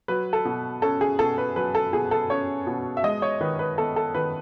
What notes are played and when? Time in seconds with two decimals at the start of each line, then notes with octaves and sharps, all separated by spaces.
0.08 F#3 B4
0.33 A4
0.45 B2
0.82 C#4 A4
1.01 G#4
1.19 B2 A4
1.38 B4
1.56 F#3 B4
1.75 A4
1.93 B2 G#4
2.11 A4
2.30 C#4 C#5
2.67 B2
2.97 E5
3.04 G#3 D#5
3.22 C#5
3.41 D#3 B4
3.59 B4
3.78 B3 A4
3.96 A4
4.15 D#3 B4